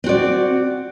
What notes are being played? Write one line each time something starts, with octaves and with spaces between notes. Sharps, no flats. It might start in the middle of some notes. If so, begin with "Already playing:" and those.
C4 F#4 D5